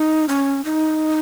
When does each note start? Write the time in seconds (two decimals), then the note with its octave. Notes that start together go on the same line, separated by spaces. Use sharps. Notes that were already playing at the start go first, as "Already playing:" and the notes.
Already playing: D#4
0.29 C#4
0.65 D#4